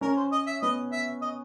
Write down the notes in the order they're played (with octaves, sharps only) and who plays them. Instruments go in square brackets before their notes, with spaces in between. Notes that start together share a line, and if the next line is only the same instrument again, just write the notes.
[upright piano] C#4 [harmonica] A#4
[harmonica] C5
D#5
E5
[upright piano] B3 [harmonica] D#5
[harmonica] E5
D#5